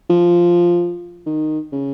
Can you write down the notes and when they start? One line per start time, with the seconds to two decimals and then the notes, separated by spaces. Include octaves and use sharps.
0.10 F3
1.26 D#3
1.72 C#3